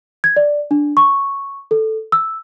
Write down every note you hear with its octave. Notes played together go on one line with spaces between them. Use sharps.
G#6
D5
D4
C#6
A4
E6